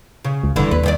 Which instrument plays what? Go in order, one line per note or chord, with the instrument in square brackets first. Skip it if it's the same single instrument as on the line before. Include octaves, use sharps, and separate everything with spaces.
[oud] C#3
[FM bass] C#2
[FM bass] F1 [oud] G2 D3 E3
[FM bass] D#2 [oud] B4
[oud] G2 D#3 D5